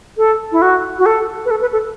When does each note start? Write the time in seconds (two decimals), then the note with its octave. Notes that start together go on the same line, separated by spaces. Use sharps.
0.18 A4
0.52 E4
0.62 F#4
0.99 F#4
1.06 A4
1.46 B4
1.51 A4
1.61 B4
1.72 A4